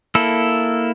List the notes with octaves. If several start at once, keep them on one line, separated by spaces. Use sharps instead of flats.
A#3 E4 A4